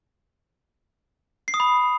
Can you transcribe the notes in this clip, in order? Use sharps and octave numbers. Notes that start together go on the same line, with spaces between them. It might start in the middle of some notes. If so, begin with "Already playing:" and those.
C7
D#6
B5